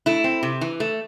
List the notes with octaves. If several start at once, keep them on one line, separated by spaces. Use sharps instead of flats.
A3 E4
C4
C3
E3
A3